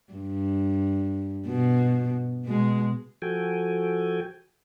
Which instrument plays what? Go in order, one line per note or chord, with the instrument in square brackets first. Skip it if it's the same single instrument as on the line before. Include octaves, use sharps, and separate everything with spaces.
[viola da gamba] G2
B2
B2 G#3
[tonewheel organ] F3 F#4 A4 G5 G#5